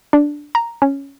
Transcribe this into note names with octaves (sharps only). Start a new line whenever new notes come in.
D4
A#5
C#4